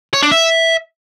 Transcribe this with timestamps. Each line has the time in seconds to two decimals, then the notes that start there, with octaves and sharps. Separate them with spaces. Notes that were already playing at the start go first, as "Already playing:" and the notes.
0.14 C#5
0.23 D4
0.31 E5